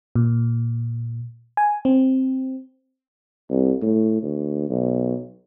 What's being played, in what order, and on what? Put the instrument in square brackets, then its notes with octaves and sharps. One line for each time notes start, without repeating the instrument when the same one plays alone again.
[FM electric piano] A#2
G#5
C4
[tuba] C2
A2
D2
B1